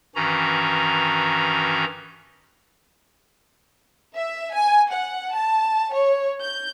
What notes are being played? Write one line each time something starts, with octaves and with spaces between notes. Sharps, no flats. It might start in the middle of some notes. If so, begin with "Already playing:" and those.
G2 D#3 E3 C#4 F#4 A#5
E5
G#5
F#5
A5
C#5
G6